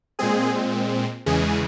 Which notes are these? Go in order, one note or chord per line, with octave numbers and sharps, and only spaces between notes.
A#2 G#3 C4 G#4
E2 C#3 E3 G#3 G#4